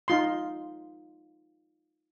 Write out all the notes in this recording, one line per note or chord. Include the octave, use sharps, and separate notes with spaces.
D#4 F4 C6